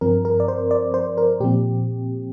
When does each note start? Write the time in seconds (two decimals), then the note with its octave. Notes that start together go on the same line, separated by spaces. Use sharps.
0.01 G2 F3 C4 A#4
0.25 A#4
0.40 D5
0.48 C5
0.71 D5
0.94 C5
1.18 A#4
1.40 A#2 F3 C4 G4